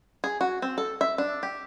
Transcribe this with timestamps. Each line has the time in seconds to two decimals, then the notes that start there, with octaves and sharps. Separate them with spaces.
0.24 G#4
0.41 F#4
0.62 C4
0.78 A4
1.01 E5
1.18 D4
1.43 G4